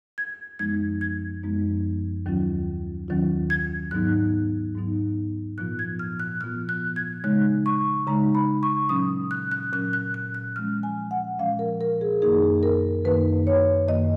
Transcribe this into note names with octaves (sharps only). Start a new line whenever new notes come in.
G#6
F#2 F3 G#3 B3 D#4 G#6
G#6
F#2 F3 G#3 B3 D#4
D#2 D#3 F#3 C#4 F4
D#2 D#3 F#3 C#4 F4
G#6
G#2 F#3 B3 D#4 F#6
G#2 F#3 B3 D#4
A#2 F3 B3 F4 F#6
G#6
F6
F#6
A#2 F3 B3 F4 F6
F#6
G#6
C#3 G#3 D#4 F#6
C#6
C#3 G#3 D#4 A#5
B5
C#6
A#2 F#3 C#4 D#6
F#6
F#6
A#2 F#3 C#4 F#6
F#6
F#6
F#6
A#2 F3 G#3 C#4 F6
G#5
F#5
A#2 F3 G#3 C#4 F5
A#4
A#4
G#4
F#2 D#3 A#3 D#4 G#4
A#4
F#2 D#3 A#3 D#4 B4
C#5
F#2 D#3 A#3 D#5